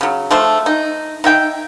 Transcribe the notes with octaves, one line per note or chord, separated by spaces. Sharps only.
C#3 F#3
F3 A3 C5
D#4
D#4 E5 G5